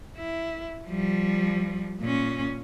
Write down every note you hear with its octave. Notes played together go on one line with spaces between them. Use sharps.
E4
F3 G3
A#2 C#4